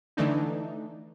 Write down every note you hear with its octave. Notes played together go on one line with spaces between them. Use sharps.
D3 E3 A3 D4 D#4